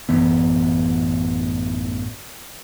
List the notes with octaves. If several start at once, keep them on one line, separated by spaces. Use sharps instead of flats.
A1 F#2 E3 B3